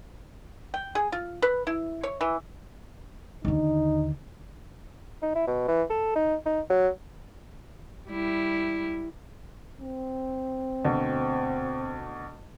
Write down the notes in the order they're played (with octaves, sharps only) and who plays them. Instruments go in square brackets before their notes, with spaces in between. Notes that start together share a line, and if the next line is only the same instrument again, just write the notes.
[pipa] G5
G#4
F4
B4
E4
C#5
E3
[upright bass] D#2 D3 [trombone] D#4
[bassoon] D#4
E4
B2
E3
A4
D#4
D#4
F#3
[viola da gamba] G3 E4
[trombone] C4
[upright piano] D2 B2